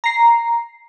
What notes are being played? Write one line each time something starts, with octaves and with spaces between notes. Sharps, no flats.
A#5 C7